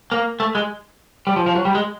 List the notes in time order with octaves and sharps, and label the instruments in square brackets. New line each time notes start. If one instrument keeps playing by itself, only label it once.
[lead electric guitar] A#3
A3
G#3
G3
F3
F3
F#3
G3
G#3